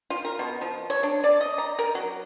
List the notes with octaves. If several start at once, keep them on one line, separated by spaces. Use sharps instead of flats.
F4
A#4
B2
F3
C#5
D4
D5
D#5
A#5
A#4
F#3